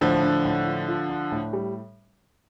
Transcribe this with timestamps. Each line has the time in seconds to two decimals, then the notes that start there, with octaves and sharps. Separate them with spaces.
0.01 A2 D3 F3
0.23 D4
0.45 A2
0.66 F4
0.88 F4
1.09 D4
1.32 A2
1.53 G3